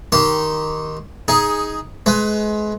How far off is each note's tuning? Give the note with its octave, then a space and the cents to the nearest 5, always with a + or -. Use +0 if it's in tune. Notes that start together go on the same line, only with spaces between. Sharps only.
D#3 +0 G4 -20 C6 +0
D#4 +15 G#4 +0
G#3 +30 B4 +25